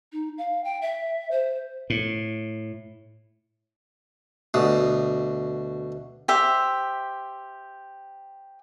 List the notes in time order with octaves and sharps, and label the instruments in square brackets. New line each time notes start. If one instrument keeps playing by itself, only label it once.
[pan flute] D#4
F5
G5
E5
C5
[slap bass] A2
[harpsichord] D2 B2
[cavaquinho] G4 C5 E5